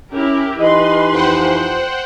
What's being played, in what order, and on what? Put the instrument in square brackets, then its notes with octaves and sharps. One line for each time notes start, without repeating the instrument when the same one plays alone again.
[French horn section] C#4 [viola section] E4 G4 A#4
[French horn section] E3 D#4 G4 [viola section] B4 C6 [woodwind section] D#5
[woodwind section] F2 [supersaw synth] C5 F#5 G5